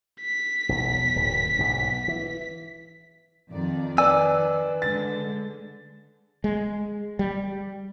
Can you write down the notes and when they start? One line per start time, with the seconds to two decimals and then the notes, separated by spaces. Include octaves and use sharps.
0.21 B6
0.69 E1 B1
1.16 D1 G#2
1.58 B1 G#2 B2
2.08 E3
3.51 F2 D#3 D5
3.98 D#3 B4 D5 G#5 E6
4.82 D3 G#3 A6
6.44 G#3
7.19 G3